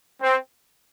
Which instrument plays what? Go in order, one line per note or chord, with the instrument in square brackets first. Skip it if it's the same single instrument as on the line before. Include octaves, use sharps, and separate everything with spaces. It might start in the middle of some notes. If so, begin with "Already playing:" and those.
[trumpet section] C4